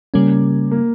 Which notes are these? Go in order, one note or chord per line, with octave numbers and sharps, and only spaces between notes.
C#3 G3 A#3 C#4
A#3